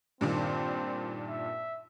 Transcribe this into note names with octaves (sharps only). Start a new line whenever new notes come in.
G2 A#2 D#3 C4
E5